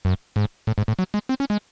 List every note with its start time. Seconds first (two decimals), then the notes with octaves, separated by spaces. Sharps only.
0.05 F#2
0.36 G#2
0.67 A2
0.78 G#2
0.88 A2
0.99 F#3
1.14 G#3
1.29 C4
1.40 C#4
1.50 G#3